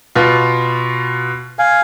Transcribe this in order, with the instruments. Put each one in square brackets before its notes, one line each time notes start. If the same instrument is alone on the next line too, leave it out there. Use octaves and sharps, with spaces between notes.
[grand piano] B2 F4
[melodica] F5 G#5